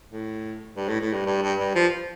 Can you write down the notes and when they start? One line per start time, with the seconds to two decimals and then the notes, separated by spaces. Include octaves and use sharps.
0.10 A2
0.76 G2
0.88 A2
1.00 A2
1.12 G2
1.26 G2
1.42 G2
1.59 G2
1.75 F3